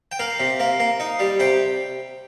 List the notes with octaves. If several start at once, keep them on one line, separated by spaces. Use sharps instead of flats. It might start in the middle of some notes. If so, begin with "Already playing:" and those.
G5
A#3 F5
C3
A#3
A#3
D#4
G3
C3 G5